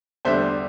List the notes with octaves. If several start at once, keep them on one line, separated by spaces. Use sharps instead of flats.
E2 D3 G3 D4 C5 E5